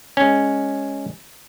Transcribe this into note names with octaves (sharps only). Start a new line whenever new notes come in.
G#3 C#4